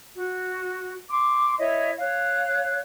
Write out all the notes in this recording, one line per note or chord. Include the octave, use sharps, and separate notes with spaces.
F#4
C6 D6
E4 C#5 D#5 E5
C#5 F5 F#6